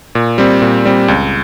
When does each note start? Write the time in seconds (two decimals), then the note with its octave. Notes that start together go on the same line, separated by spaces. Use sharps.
0.15 A#2
0.38 G3 C4
0.62 A#2
0.85 G3 C4
1.08 C#2